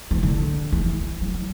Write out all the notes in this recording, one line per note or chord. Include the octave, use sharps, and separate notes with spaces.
E3
D3
E3
F#3